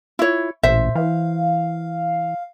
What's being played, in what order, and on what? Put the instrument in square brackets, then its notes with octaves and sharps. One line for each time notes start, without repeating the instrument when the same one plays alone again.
[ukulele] E4 C#5 [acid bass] F4
[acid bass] A1 [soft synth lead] A#2 [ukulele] C5 E5
[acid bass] E3 [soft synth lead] F5